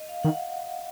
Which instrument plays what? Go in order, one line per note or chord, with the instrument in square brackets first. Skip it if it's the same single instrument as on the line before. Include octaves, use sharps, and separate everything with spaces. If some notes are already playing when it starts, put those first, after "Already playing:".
Already playing: [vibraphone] D#5
F5
[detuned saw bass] D#3 [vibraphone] F#5
[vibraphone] F#5